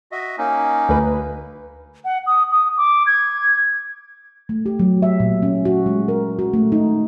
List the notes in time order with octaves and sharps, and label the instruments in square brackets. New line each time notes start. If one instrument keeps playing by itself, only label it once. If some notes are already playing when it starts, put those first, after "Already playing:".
[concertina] F#4 D#5 E5
A#3 C#4 D#4
[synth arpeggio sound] D2 B4
[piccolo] F#5
D#6
D#6
D6
G#6
[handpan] A3
G4
F#3
E5
A#2
C#4
F#4
G#3
A#4
F#4
A3
D#4